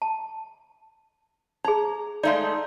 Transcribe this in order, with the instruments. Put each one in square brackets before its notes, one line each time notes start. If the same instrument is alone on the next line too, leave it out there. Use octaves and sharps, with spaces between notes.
[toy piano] A5
[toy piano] D#4 G#4 [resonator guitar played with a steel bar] A#5
[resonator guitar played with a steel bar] G#3 A3 D#4 [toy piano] D5 F5